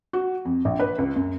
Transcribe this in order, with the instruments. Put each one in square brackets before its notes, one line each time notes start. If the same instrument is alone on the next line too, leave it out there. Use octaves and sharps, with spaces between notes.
[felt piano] F#4
F2
A#1
B4
C#2
F#2